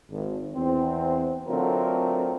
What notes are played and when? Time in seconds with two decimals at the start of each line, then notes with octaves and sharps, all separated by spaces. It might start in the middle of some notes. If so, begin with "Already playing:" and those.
0.10 G#1
0.54 E2 C4
1.48 D3 F#3 A3 C4 F4 A#4